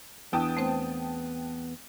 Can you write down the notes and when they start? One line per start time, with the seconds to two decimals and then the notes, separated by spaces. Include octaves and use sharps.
0.33 E2 B3 D4 E4 G5 A5 D#6
0.57 A3 C4 C5